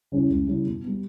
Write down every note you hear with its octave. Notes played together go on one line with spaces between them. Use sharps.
C#3 G3 C#4 E4
C#2
C#3 G3 C#4 E4
B2
G3 B3